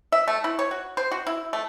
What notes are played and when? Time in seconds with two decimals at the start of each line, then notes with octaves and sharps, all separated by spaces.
0.12 E5
0.28 A3
0.44 E4
0.59 C#5
0.71 F#4
0.97 C5
1.12 F#4
1.27 E4
1.53 A3